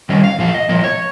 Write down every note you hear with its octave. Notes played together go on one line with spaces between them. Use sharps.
D#3 G3 C#4 D#5
F5
A#2 F3 F5
D#5
A#2 F3 D#5
C#5